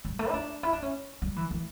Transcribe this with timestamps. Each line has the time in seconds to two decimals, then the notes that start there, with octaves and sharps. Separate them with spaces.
0.05 G3
0.19 A3
0.29 E4
0.34 D4
0.63 E4
0.73 D4
0.82 C#4
1.22 G3
1.36 E3
1.51 E3